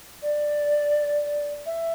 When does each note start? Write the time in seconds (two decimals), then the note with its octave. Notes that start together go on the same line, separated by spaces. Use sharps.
0.22 D5
1.66 E5